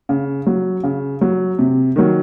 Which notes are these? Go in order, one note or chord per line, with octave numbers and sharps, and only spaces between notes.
C#3
F#3
C#3
F#3
C3
D#3 F#3